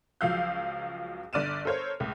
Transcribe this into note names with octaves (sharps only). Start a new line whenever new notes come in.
C#2 F3 F#3 F5 E6 G6
G1 D3 D5 F6 D#7 E7
A4 A#4 C5 C#5 F6
C#2 A2